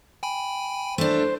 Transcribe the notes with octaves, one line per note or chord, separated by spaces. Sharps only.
G5 G#5 B5
A3 D4 C5